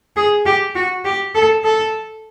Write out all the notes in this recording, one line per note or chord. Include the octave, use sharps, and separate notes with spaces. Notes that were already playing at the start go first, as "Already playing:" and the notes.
G#4
G4
F#4
G4
A4
A4